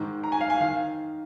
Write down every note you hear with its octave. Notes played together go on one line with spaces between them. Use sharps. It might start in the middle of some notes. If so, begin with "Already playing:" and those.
Already playing: G#2 D#3
A#5
G#5
F5
G#5
D#3 F5